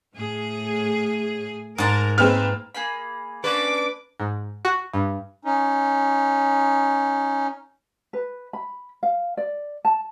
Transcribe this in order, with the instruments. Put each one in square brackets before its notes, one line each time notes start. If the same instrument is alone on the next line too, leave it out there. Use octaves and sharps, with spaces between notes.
[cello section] A2 G#4
[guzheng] G#2 A5 A#5 [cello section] A#4
[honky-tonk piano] G#3 C4 B4 [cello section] A#3 [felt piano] F6
[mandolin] A#3 G#4 B5
[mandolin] A#3 C#4 D4 [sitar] B4 [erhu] D6
[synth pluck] G#2
F#4
G2
[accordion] C#4 D#4
[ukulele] B4
B5
F5
D5
A5